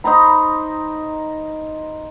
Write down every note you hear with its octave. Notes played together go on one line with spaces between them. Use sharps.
D#4 C5 A#5 B5